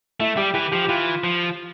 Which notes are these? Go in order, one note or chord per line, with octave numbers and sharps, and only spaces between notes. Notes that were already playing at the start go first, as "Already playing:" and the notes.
A3 E4
G3 G4
E3 G4
F3 G4
G4
E3 F4
F3